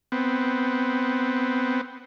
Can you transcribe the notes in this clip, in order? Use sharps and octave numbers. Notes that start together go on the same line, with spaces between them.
B3 C4